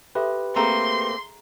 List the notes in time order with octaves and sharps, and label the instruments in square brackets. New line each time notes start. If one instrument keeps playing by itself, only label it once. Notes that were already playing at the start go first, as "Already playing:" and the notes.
[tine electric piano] G4 B4 [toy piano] A4 E5 C6
[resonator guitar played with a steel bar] A3 A#3 C4 [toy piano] G#4 A5 A#5 [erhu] C6